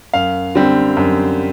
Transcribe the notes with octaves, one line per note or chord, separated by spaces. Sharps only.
F#2 F5
D3 G3 C4
F#2